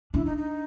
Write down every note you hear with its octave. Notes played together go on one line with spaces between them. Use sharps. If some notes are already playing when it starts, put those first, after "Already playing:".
D4 E4
D#4
D#4